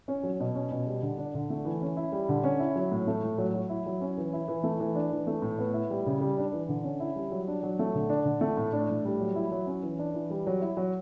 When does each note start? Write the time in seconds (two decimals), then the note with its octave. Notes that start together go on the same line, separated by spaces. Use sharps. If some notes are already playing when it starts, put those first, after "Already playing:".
0.08 C#4
0.23 F#3
0.40 B2
0.55 C#4
0.72 B2
0.87 G3
1.03 D3
1.18 D4
1.35 D3
1.50 A3
1.65 E3
1.82 C#4
1.97 E4
2.12 G3
2.29 D3
2.44 C#4
2.59 E4
2.76 F#3
2.92 A2
3.07 A3
3.23 A2
3.38 F#3
3.54 F#3
3.69 E4
3.86 F#3
4.01 C#4
4.18 E3
4.33 E4
4.48 E3
4.64 A3
4.80 E3
4.95 D4
5.11 E3
5.27 A3
5.42 A2
5.59 B3
5.74 E4
5.90 G3
6.06 C#3
6.21 G3
6.38 D4
6.53 E3
6.69 D3
6.84 C#4
7.00 E4
7.16 G3
7.32 F#3
7.48 D4
7.63 F#3
7.79 A3
7.95 D3
8.09 D4
8.25 D3
8.41 A3
8.57 A2
8.73 D4
8.89 A2
9.05 G3
9.20 F#3
9.36 E4
9.52 F#3
9.67 C#4
9.83 E3
9.99 D4
10.14 E3
10.30 G3
10.47 F#3
10.61 E4
10.77 F#3